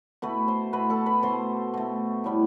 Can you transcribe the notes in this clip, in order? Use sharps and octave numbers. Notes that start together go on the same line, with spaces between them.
B2 A3 B4 B5
C5 C6
B2 A3 B4 B5
A4 A5
B4 B5
B2 A3 C5 C6
B2 A3
A2 G3 B3